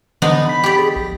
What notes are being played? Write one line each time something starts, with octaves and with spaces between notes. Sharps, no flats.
D3 E3 B3 D4 D#4
B5 B6
G4 D5
G#4
A#1